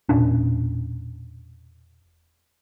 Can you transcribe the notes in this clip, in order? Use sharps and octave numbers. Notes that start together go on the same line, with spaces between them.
E1 A#2 C#4 D4